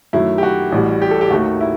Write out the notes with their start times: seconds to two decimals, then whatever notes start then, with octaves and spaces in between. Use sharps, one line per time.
0.13 F#2 D#3 F#3 A3 E4
0.38 G4
0.43 F#4
0.72 A1 A2 G3
1.02 G4
1.11 A4
1.21 G4
1.31 D#2 D#3 A3 F#4
1.61 E4